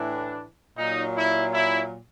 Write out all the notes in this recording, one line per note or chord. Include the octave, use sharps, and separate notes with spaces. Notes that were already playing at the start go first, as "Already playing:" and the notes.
Already playing: A2 E3 D4
A#2 F#3 D#4
E4
E4